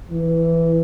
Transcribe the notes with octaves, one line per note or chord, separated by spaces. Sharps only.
E3